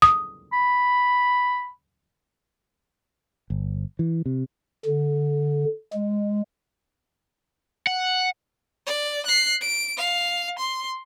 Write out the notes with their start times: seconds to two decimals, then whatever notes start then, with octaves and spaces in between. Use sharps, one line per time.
0.02 D#6
0.53 B5
3.50 G1
3.99 E3
4.26 C3
4.85 D3
5.93 G#3
7.87 F#5
8.87 D5
9.26 F#6 C7
9.62 D7
9.97 F5
10.58 C6